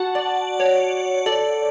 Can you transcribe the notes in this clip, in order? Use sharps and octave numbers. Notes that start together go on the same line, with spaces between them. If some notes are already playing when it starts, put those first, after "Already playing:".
Already playing: F#4 F#5 A5
D5
C#5
A4 D5